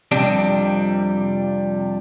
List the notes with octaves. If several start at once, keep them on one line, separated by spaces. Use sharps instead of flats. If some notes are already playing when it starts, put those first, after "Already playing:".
F2 C3 G3 D4